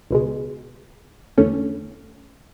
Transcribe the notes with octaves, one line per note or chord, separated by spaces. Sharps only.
C#2 B2 G#3
E2 D3 A3 C#4